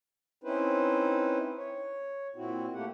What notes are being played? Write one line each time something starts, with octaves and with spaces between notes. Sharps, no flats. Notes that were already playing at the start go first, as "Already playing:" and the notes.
C4 C#4 D#4 E4 B4 C5
C#5
A#2 C4 E4 F#4
A3 A#3 G4 F#5